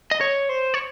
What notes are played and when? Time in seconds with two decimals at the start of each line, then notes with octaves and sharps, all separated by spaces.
0.11 D#5
0.21 C#5
0.49 C5
0.74 C#5